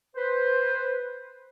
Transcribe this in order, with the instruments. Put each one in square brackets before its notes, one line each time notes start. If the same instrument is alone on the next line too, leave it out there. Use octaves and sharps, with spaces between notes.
[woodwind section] B4 C5